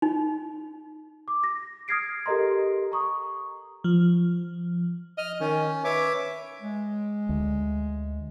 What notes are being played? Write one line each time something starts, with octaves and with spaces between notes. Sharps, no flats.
D#4
D6
A#6
D#6 F6 G#6 A#6 C7 D7
G4 A4 A#4 D#5 A#5 C6
A#5 C#6 D#6
F3
D#5 F6
D#3 C#4
B4 C#5 E5 D6
G#3
D2